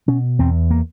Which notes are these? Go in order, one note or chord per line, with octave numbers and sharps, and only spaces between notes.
B2 C#4
E2 C4
A#3